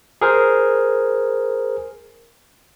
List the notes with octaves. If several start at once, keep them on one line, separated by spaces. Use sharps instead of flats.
G#4 A#4 C5